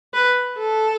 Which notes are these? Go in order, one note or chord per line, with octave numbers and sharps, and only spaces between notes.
B4
A4